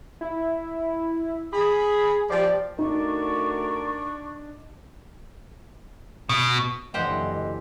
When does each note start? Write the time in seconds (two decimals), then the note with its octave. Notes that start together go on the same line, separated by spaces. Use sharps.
0.21 E4
1.53 G#4 B5
2.30 F3 G4 D5
2.79 A3 D4 D#4 F#4 A#4 C#6
6.29 B2
6.94 F#1 D3 E3 G4 C5 D#5 F#5